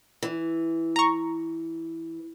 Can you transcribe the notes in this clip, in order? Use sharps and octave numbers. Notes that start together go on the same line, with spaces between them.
E3
A#5 C#6